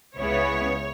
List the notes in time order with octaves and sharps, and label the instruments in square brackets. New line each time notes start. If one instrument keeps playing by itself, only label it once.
[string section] C#2 C#3 G#3 B3 E4 C#5